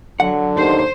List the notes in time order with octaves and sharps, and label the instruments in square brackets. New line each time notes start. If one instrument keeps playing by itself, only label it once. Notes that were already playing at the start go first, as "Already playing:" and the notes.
[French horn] D3 [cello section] F#3 [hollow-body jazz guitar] F#5
[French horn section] D#2 [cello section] C5